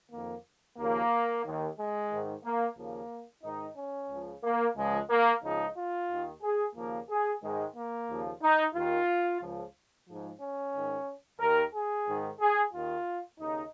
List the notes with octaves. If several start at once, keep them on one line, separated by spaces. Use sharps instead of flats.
F2 D#3 A#3
D#2 C#3 F3 A#3
D#2 D#3
G#3
G#2 D#3
A#3
D#2 C#3 F3 A#3
G#2 D#3 D#4
C#4
C#2 C#3 F3
A#3
C#2 C#3 F3 G#3
A#3
C#2 C#3 F3 D#4
F4
D#2 D#3
G#4
D#2 C#3 F3 A#3
G#4
G#2 D#3 G#3
A#3
D#2 C#3 F3
D#4
D#2 D#3 F4
C#2 C#3 F3
G#2 F3
C#4
G#2 D#3
D#2 D#3 A#4
G#4
G#2 D#3
G#4
D#2 D#3 F4
D#2 C#3 D#4